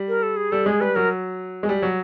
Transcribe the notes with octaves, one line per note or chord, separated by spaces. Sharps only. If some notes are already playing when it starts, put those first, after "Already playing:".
Already playing: G3
A#4
A4
G#4
G3 A4
G#3 G#4
G3 B4
F#3 A#4
G#3
G3
F#3